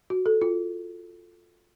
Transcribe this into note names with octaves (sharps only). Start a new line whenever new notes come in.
F#4
A4
F4